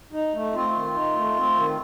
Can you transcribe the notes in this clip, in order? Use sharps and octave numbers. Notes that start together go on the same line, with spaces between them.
D#4
A3
C4 F4
D#3
D#4
A3
C4
D#3